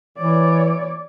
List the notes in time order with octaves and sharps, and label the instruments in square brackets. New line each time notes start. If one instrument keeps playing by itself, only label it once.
[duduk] E3 [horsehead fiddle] C#5 D5